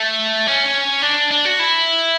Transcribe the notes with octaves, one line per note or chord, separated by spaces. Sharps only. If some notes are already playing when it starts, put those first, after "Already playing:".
Already playing: A3
C#4
D4
D4
F#4
E4